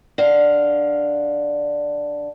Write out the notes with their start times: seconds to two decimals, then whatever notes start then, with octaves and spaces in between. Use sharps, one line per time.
0.18 D3 F5